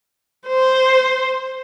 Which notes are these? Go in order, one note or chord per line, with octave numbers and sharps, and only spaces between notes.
C5